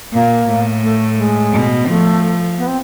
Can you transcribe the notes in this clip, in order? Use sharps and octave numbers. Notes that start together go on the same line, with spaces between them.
A#2 A#3
A2
A3
G#3
B2
F3 A3
B3
C4